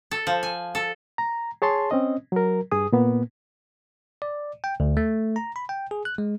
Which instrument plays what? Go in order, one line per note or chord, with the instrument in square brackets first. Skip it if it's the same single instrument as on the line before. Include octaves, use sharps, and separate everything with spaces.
[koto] A4
F3
G#5
A4
[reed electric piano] A#5
G#4 C#5 A5 C6
C4 C#4 D#5
F#3 A#4
G2 G#4 D#6
A#2 A#3 B3
[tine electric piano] D5
G5
D2
A3
A#5
B5
G5
G#4
F#6
G#3